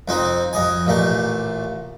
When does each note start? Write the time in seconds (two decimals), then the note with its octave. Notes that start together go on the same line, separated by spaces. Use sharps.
0.08 F2 C4 D#4
0.53 F2 D#5 G#5
0.87 A1 A#2 A3